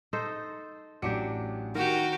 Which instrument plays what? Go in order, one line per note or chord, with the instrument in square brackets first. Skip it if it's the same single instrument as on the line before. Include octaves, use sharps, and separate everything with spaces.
[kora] D#4 A4 C5
[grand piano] A1 D6 C#7 [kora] F#3 D4 G4
[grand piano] D#3 [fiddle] F#4 G4 [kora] A#4